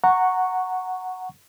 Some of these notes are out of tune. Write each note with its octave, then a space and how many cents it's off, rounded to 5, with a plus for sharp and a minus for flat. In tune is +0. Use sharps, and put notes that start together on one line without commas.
F#5 +0 A#5 -15 C#6 +0